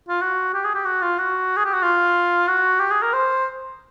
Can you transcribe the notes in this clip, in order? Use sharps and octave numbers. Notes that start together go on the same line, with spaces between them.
F4
F#4
G4
G#4
G4
F#4
F4
F#4
G#4
G4
F#4
F4
F#4
G4
G#4
A#4
C5